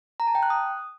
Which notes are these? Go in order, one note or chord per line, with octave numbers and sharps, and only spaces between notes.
A#5
A5
G5
F#6
D#6